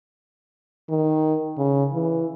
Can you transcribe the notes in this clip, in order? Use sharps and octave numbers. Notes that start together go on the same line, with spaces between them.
D#3
C#3
E3